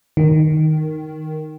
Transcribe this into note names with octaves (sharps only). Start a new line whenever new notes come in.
D#3